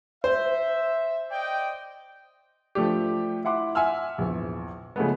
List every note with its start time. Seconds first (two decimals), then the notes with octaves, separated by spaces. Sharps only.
0.24 C5 E5
1.30 D5 D#5 G5
2.75 F3 A3 D4 G4
3.44 E4 E5 F#5 C6 D6
3.75 E5 F#5 G#5 C6 E6 F6
4.18 A#1 E2
4.96 C#3 F3 G#3 A3 B3